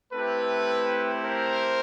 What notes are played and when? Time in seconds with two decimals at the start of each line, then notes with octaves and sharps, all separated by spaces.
0.12 A3 C4 E4 G4 A4 B4
1.24 A#4 C5